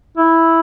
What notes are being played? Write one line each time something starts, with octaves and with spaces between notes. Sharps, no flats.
E4